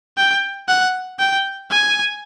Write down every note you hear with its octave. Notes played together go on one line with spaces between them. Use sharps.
G5
F#5
G5
G#5